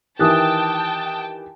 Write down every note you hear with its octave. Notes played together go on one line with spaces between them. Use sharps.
D#3 E3 G4 G5 A5 D#6 F#6 A6